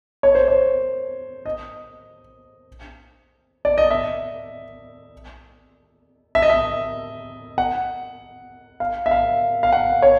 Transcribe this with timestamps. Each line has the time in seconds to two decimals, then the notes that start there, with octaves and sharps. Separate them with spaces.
0.23 C#5
0.35 C5
0.48 C#5
1.46 D#5
3.65 D5
3.78 D#5
3.91 E5
6.35 E5
6.42 D#5
6.50 E5
7.58 F#5
8.80 F5
9.06 E5
9.11 F5
9.63 F5
9.73 F#5
10.02 C#5